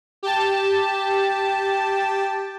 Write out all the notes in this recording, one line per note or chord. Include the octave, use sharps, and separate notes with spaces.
G4 A5